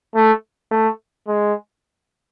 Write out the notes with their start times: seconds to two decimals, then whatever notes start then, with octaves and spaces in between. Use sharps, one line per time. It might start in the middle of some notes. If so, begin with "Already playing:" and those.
0.16 A3
0.72 A3
1.28 G#3